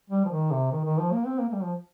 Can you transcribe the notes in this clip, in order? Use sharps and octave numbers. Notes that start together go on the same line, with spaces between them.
G3
F3
D#3
C3
D#3
D#3
F3
A#3
C4
A#3
A#3
G3
F3